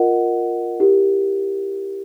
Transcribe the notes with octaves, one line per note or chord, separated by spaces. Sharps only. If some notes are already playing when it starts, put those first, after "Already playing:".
Already playing: F4 A#4 D#5 F#5
E4 G4 A#4